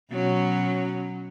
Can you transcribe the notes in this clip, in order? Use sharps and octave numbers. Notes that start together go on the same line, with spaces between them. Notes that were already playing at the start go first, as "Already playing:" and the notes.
B2 F#3 C#4